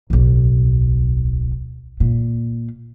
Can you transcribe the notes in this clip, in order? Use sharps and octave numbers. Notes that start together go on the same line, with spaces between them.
D1 B1
A#2